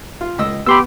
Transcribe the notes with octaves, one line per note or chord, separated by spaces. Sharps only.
F4
C#2 D#5 E6
B3 G4 B5 C6 E6